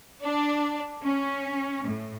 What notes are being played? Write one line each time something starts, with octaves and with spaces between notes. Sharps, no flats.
D4
C#4
A2